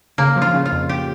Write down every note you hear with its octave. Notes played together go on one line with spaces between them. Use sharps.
C#3 A#3
F3
F4
C#3
F4
F2
G4